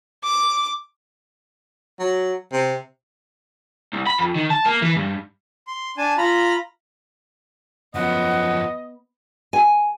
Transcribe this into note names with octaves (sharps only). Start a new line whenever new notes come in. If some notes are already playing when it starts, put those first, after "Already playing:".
D6
F#3
C3
C2
B5
F2
D#3
A5
A#3
E3
G2
C6
D4 G#5 A5
F4 A#5 B5
F#2 F3 B3 D#5 F#5
G#5